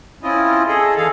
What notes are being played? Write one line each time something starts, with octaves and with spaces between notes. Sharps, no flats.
C4 C#4 E4 F4 D#5
G#4 A4 D#5
D3 E3 G#4 A4 F5